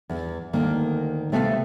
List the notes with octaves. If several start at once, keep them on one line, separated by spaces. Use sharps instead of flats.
E2
D2 D#3 A#3
C3 A3 B3 E5 F5